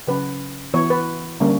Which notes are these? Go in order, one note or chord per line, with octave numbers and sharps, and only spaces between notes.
C#3 F#3 C#4 B4
E3 B3 C#5
B4
D3 G3 A#3 C#4